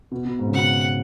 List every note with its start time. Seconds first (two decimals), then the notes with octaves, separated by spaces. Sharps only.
0.12 B2
0.25 B2
0.39 G#2
0.47 C#3
0.53 B2 F#5